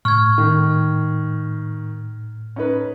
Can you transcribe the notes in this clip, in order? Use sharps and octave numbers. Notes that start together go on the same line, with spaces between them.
A2 C#6 F6 G#6
D#3
C#4 D#4 B4